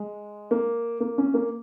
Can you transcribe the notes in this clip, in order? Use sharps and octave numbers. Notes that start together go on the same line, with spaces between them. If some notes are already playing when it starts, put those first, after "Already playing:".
Already playing: G#3
A#3
A#3
C#4
A#3